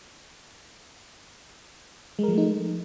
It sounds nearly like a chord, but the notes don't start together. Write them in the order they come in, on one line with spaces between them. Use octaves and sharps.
G#3 A#4 F3 A3 D#4